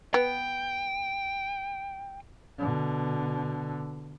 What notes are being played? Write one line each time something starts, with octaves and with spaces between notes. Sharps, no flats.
B3 G5
B2 D3